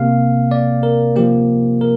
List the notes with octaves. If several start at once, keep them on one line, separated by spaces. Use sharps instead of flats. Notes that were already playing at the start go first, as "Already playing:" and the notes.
Already playing: C3 A#3 F5
D5
A#4
C3 F3 A#3 G4
A#4